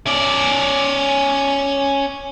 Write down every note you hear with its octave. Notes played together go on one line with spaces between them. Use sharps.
C#4 D5